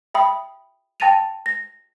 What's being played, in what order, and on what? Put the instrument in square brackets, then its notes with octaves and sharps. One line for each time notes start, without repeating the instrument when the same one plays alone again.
[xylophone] E5 G5 B5 D#6
G5 A5 A6 A#6 D#7 F7
A#6